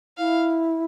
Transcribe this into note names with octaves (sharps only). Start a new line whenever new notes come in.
E4 F5